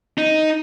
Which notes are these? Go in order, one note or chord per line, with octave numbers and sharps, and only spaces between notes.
D#4